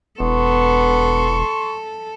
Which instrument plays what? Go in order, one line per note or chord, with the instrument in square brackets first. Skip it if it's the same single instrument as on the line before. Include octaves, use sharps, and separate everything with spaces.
[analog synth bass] E1 [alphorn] B3 [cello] A4 [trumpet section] C6 C#6